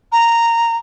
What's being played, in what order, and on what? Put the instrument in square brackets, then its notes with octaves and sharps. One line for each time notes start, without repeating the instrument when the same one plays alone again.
[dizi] A#5